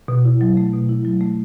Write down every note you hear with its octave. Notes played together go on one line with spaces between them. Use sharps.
B2
E4
F#3
A3
B2
E4
F#3
A3